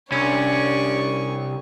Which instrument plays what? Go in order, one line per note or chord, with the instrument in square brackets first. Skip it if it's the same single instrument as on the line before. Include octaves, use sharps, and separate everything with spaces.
[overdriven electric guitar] C2 [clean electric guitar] C#4 [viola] D4 [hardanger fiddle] C#5 C#6